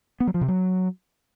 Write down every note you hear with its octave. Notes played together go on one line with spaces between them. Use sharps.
B3
F#3
F3
C3
F#3